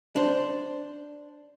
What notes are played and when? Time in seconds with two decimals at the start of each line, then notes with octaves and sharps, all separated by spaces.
0.16 D4 C5